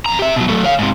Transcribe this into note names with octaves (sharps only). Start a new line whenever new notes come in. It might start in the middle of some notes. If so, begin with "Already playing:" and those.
F2 A#5
G4 E5
B2 F#3
F#3 A3
C#5 F5
G#2 C3